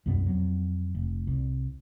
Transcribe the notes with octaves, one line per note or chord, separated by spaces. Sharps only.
C2 F#2 B2 B3
F2 F#3
F1
C2